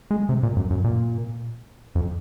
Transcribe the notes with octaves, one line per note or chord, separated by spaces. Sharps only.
G#3
C3
A#2
F#2
F#2
A#2
F2